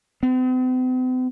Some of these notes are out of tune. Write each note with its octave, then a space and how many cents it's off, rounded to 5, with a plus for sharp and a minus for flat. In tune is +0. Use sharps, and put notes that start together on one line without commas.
C4 -45